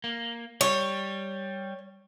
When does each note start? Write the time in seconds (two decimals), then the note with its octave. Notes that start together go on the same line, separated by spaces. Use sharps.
0.04 A#3
0.61 G3 C#5